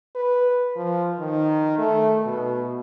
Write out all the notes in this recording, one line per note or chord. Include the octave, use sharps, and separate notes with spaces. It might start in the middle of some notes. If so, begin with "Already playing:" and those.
B4
F3
D#3
A3
B2